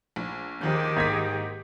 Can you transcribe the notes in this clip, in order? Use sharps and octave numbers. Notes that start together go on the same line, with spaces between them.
A#1
D#2 D#3 F3 G4 G#4 G6
G#2 A#3 G#6 B6